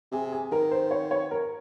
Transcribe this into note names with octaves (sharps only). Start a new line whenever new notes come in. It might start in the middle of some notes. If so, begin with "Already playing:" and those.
C3 G#4
G#4
D#3 A#4
C5
C#5
C#5
A#4